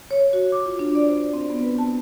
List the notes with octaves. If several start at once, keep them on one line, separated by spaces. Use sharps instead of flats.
C#5
F#4
D6
F4
D4
D5
C5
C4
B3
B4
A5